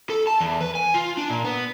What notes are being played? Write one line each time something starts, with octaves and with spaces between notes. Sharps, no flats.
A4
A5
E2
B4
G#5
F4
D4
A#2
B3